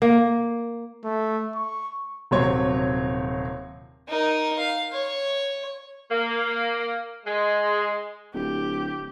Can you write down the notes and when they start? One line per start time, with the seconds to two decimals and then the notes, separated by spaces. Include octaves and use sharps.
0.02 A#3
1.04 A3
1.55 C#6
2.31 D#1 C3 F#3 C4 C#5 G#6
4.08 D#4 A#4
4.59 F5
4.92 C#5
6.11 A#3
7.26 G#3
8.34 D1 G4